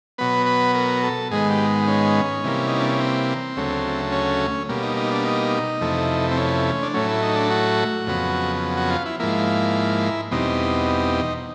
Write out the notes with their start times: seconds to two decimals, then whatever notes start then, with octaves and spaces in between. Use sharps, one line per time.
0.18 B2 F#3 B3 B4
0.46 B4
0.74 A#4
1.03 A4
1.31 G#2 D#3 G#3 B3 G#4
1.49 G4
1.88 C#4
2.44 C3 E3 G3 A#3
2.68 D#4
2.79 D4
2.90 C#4
3.00 C4
3.57 D2 C#3 F#3 A3
4.12 C#4
4.69 B2 G3 A#3
4.82 D#4
4.97 D#4
5.11 D4
5.25 D#4
5.81 F2 C3 E3 A3
6.31 C4
6.37 C#4
6.83 D4
6.94 A2 F#3 A3 C#4
7.08 E4
7.23 D#4
7.36 D4
7.51 F#4
8.07 F2 C#3 F#3 B3
8.77 F#4
8.90 F4
9.06 E4
9.20 G#2 F3 A#3 E4
10.31 E2 B2 G3 C4 D#4